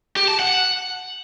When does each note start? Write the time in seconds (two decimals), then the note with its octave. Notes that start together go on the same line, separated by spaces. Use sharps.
0.16 G4
0.28 A5
0.39 F#5